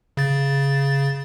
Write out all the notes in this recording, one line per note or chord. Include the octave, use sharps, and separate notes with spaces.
C#3 A6